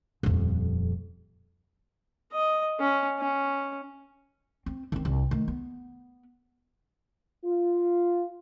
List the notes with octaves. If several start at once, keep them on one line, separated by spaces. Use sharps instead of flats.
D#1 F2
D#5
C#4
C#4
C4
D#3 C4
C2
D#3 A3
B3
F4